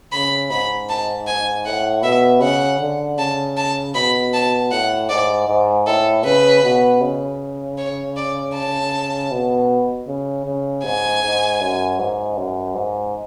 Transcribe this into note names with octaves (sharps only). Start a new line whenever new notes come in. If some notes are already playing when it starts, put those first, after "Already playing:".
C#3 B5
G#2 B5
A5
G#5
A2 F#5
B2 E5
C#3 F#5
D3
C#3 A5
A5
B2 B5
A5
A2 F#5
G#2 D5
G#2
A2 A4
C#3 B4
B2
C#3
C#5
D5
A5
B2
C#3
C#3
G#2 G#5
G#2
F#2
G#2
F#2
G#2